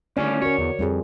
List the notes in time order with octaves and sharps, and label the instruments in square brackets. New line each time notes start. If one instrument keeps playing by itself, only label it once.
[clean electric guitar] D#2 A2 G3 [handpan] D3 D5 [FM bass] C#4
[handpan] F#4 A#4 [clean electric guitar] C#5
[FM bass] E2
[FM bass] F2 [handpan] G3 F4 G#4